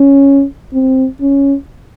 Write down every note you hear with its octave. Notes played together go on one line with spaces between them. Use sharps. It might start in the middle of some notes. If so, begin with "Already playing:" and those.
Already playing: C#4
C4
C#4